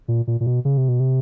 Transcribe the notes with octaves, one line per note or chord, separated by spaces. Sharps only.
A#2
A#2
A#2
B2
C#3
C3
B2
C3